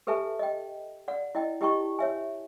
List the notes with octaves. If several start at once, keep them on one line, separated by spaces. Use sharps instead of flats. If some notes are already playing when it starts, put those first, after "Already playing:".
G4 A4 B4 E5 G#5 A5
D#5 G5
D5 F#5
E4 D#5 G5
E4 G4 D#5 G5 A5 C#6
C#5 E5 G#5